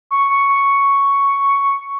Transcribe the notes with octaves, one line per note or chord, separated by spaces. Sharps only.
C#6
C#6
C#6